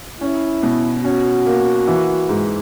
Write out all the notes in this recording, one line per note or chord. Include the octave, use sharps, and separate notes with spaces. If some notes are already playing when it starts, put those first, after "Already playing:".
C#4 E4
B2
C#4 F#4
A#3
E3
G#2